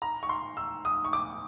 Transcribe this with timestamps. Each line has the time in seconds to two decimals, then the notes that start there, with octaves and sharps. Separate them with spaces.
0.02 A#5
0.23 C#6
0.29 C6
0.57 E6
0.85 D#6
1.05 C#6
1.13 D6